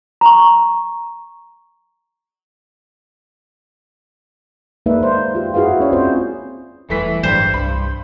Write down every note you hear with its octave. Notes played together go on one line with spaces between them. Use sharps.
A#5 C#6
G#3 A#3 D#4 B4 D5 E5
C5
F4 G4
E4 F#4 G#4 B4 F5
C#4 C#5 D5
C4 C#4 F4 C5 C#5
E1 E3 G3 A3 B6
A1 G2 E3 F#3 G3 C5
C2 B5